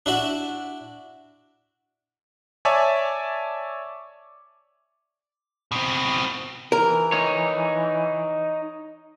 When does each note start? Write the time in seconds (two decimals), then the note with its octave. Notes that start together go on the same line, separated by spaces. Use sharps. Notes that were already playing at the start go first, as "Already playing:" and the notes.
0.06 D4 E4 F#4
2.65 C#5 D5 E5 G#5 A5 D6
5.72 B2 C4
6.72 E3 A#4
7.12 D#4 C#5